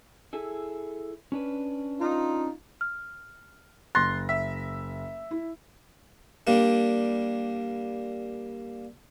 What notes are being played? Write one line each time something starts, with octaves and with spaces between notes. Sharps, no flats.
E4 G#4 A4
C#4 D4 B4
D#4 F4
F6
F#1 C6 F#6 A6 A#6
E5 B6
E4
G3 A#3 D4